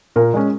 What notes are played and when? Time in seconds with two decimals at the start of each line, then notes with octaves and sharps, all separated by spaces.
0.16 A#2 A#4
0.34 G#3 C#4